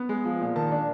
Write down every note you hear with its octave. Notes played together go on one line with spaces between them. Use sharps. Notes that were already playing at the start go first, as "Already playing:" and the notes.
Already playing: B3
G#3
F3
A#2
D#3 A5
D4